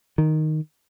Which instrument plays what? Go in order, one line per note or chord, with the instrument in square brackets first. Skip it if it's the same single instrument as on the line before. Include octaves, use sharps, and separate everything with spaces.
[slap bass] D#3